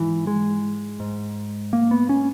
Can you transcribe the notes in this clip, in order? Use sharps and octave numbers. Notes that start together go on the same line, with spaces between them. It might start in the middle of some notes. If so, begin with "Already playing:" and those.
Already playing: G#2 E3
G#3
G#2
A#3
B3
C#4